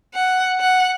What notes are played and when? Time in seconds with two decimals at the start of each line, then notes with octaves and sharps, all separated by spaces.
0.14 F#5
0.60 F#5